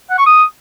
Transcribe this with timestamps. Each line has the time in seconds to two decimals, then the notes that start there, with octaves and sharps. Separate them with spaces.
0.10 F#5
0.18 C#6
0.26 D#6